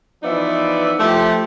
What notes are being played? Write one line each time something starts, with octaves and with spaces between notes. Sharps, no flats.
E3 F3 B3 D#4 D5 E5
F3 A3 G4